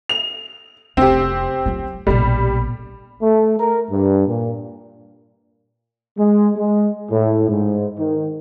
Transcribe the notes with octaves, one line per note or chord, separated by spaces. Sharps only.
F7
F1 C4 G4
F#3 F4
A#1 B2 G3
A3
A#4
G2
A#2
G#3
G#3
A2
G#2
D#3